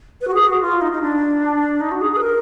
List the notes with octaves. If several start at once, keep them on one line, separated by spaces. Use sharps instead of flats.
B4
F#4
G#4
F#4
F4
D#4
D#4
D4
D#4
F#4
G#4
G#4
B4
A#4